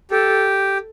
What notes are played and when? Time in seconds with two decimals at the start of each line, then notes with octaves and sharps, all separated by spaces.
0.11 G4 A4